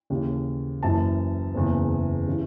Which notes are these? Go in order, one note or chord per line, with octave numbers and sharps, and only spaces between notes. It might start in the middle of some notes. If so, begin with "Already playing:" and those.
D#2 C#3 E3
F#1 F#2 E3 A5
F#1 E2 C#3
C#3 E3